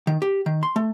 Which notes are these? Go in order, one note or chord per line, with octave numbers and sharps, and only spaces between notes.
D#3
G4
D#3
C6
A3